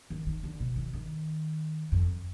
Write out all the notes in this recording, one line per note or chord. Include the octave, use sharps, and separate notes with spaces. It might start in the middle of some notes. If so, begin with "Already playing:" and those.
D#3
D#3
D3
B2
D#3
D#3
F2